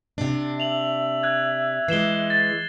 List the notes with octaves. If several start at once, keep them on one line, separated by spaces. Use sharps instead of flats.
C3 D4
E5 F7 F#7
F#6 G#6
E3 G#3 C7 E7 G7
A6